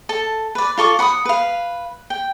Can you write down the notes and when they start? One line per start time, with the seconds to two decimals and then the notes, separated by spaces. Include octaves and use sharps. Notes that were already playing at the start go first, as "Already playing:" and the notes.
0.09 A4 A5
0.55 B4 D5
0.77 F4 A4 C#6 D6
0.99 F#5 B5 C#6 D#6
1.25 B4 F5
2.10 G5